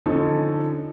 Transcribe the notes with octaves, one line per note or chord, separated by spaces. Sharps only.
D3 F3 C#4 D#4 A4 C#5